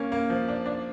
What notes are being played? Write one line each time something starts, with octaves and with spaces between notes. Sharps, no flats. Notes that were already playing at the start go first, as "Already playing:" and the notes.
Already playing: A#3 C#4
A#3
F3
D4
D4